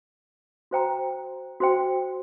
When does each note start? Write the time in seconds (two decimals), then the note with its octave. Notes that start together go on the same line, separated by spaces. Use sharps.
0.71 F#4 C5 G5 A#5
1.60 F#4 C5 G5